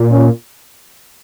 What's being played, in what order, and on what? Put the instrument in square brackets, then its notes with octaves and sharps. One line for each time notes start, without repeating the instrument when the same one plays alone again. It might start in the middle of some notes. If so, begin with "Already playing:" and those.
Already playing: [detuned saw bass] A#2
[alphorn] C#4